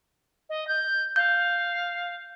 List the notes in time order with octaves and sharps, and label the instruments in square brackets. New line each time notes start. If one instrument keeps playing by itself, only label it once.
[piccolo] D#5
G6
[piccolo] F5 [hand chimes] G6